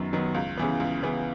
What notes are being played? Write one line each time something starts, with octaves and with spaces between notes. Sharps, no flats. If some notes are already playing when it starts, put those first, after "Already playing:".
Already playing: F#2 D#3 F#3 B3
D#3 F#3 B3
C#2
C#3 E3 B3
C#2
C#3 E3 B3